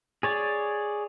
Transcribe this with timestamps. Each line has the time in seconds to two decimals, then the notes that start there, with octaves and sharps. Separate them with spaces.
0.23 G#4 C#5 D5